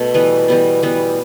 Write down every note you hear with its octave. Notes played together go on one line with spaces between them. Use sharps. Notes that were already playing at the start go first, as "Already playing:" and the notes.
Already playing: B2 A3
E3 G3 B3
E3 G3 B3
E3 G3 B3